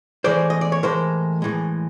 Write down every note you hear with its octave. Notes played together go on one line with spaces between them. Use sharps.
A2 E3 G#3 C5 D5
D#5
D5
C#5
A2 E3 G#3 A#4 C5
A2 E3 G#3